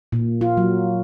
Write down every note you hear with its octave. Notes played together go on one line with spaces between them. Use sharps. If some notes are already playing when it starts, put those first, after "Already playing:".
A#2
F4
F#3